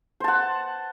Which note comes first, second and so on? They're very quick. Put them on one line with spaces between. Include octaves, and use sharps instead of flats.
C5 A5 F#5